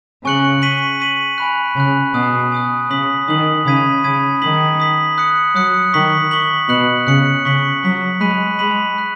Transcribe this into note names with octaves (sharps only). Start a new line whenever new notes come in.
C#3 G#5 C#6 F#6 C#7 F#7
C#6 B6 D#7 F#7
C#6 B6 D#7 F#7
G#5 B5 F#6
C#3 G#5 B5 F#6
B2 G#5 D#6 F#6
G#5 D#6 F#6
C#3 D#6 B6 F#7
D#3 D#6 B6 F#7
C#3 B5 D#6 G#6 B6 D#7
C#3 B5 D#6 G#6 B6 D#7
D#3 D#6 B6 F#7
D#6 B6 F#7
D#6 F#6 C#7
F#3 D#6 F#6 C#7
D#3 C#6 B6 F#7
C#6 B6 F#7
B2 F#6 C#7 F#7
C#3 F#6 C#7 F#7
C#3 C#6 B6 F#7
F#3 C#6 B6 F#7
G#3 B5 F#6 B6 D#7 F#7
G#3 B5 F#6 B6 D#7 F#7
B5 F#6 B6